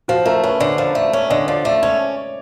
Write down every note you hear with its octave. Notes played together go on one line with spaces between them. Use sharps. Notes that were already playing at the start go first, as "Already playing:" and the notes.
F3 F#4
A3 A#4
C#4 B4
D3 C5
F3 D5
A3 D5
C#4 D5
D3 D#5
F3 D5
A3 D5
C#4 C#5